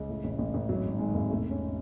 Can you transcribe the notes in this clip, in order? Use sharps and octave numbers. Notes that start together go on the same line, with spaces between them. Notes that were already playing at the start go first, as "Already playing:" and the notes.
Already playing: C#2
A2
A1
A1
A1
G#1 F#3
G#2
D#3 G#3
G#1
E1 A3
E1
C#4